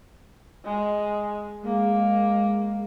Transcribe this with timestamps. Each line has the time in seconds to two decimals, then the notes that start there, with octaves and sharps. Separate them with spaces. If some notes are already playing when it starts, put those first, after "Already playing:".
0.65 G#3
1.64 G#3 A#3